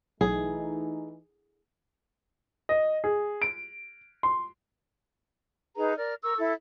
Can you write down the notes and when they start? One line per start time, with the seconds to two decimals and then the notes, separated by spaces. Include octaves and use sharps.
0.21 B1 E3 A3 D#4 G#4
2.69 D#5
3.04 G#4
3.42 D7
4.23 C6
5.76 D#4 G#4 B4 A#5
5.96 A#4 D5 F6
6.23 A#4 C#6 E6
6.37 E4 A4